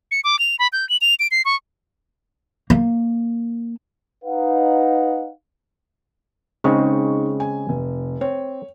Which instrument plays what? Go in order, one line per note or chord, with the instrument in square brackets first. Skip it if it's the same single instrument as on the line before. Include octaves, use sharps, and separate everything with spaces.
[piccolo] C#7
D6
F7
B5
G6
F#7
F7
D7
C7
C#6
[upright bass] A#3
[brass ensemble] D#4 B4 F5 F#5
[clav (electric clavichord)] C#3 G#3 C4 [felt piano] D#4 C#6
[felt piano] G#5
F1
[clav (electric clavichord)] C4 [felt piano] C#5